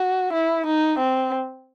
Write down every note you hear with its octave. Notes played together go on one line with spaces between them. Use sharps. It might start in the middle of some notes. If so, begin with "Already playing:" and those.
Already playing: F#4
E4
D#4
C4